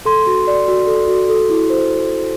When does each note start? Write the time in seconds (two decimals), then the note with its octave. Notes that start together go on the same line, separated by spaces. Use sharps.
0.05 A4 C6
0.27 F#4
0.47 D5
0.68 F#4
0.87 A4
1.08 F#4
1.29 A4
1.50 E4
1.70 C5